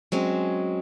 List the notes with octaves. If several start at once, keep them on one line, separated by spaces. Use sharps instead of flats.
F#3 G#3 C4 C#4